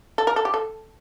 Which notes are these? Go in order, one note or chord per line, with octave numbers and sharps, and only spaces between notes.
A4
A#4
A4
G4
A4